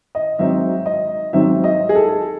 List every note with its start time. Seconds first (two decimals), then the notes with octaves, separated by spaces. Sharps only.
0.15 D#5
0.39 G#2 F#3 C4 D#4 E5
0.86 D#5
1.33 G#2 F#3 C4 D#4 E5
1.64 D#5
1.89 G#4
1.95 A4